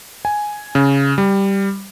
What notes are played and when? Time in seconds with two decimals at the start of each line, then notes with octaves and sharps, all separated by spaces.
0.25 G#5
0.75 C#3
1.18 G3